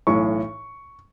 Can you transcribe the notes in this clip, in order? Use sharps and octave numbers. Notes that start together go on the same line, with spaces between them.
B1 A2 E3 C#6